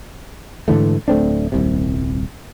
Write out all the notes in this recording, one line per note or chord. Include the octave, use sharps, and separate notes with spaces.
G#2 D3 E3 A3
D1 A3 C4 D4
D#1 C2 C3